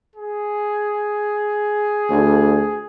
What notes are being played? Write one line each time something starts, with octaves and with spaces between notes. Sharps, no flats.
G#4
D2